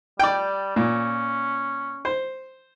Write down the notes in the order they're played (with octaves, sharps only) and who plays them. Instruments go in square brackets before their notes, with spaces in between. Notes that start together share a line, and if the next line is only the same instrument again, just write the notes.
[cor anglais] G3 [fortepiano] D5 G5
[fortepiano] A#2 [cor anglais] C#4
[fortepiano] C5